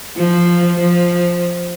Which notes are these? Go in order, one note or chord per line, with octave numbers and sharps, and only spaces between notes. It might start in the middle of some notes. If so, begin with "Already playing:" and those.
F3
F3